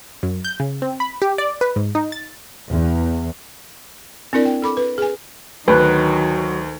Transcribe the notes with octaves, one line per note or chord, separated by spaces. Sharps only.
F#2
G6
C#3
C4
B5
G4
D5
B4
G#2
D#4
A6
E2
C4 D4 E4 A#4 D5
G5
A4 B5 D6
B4
G#4 B4 G#5
D2 D#3 F#3 B4